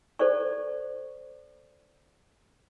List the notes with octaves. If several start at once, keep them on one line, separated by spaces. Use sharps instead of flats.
A4 C5 D5 C#6